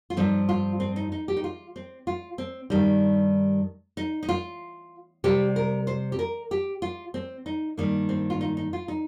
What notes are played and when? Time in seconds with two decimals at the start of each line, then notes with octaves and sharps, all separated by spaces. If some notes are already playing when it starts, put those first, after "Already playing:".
0.10 F4
0.17 G2 F3 C4 D#4
0.49 F4
0.80 C4
0.96 D#4
1.12 D#4
1.28 G4
1.36 D#4
1.44 F4
1.76 C4
2.07 F4
2.38 C4
2.70 G2 D#3 G3 D#4
3.97 D#4
4.23 D#4
4.29 F4
5.24 C3 G3 C4 G4
5.56 A#4
5.87 C5
6.12 G4
6.19 A#4
6.51 G4
6.82 F4
7.14 C4
7.46 D#4
7.77 G2 D#3 A#3
8.09 C4
8.30 F4
8.41 D#4
8.57 D#4
8.73 F4
8.88 D#4